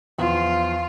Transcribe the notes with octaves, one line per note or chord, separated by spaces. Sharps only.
E2 F3 F4